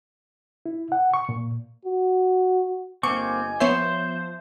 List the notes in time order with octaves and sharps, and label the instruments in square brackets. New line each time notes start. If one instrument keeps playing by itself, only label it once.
[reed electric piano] E4
F#5
C#6
A#2
[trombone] F#4
[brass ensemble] G1 D#5 G#5 [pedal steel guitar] A#3 C4 [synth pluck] C#6 [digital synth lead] D6
[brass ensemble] F3 [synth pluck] B3 C#5 C7 [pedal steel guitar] C5 [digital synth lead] E5